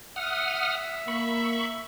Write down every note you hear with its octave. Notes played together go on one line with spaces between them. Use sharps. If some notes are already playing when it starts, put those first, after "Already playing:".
E5 F#5 D#6 F6
A#3 B5 C#6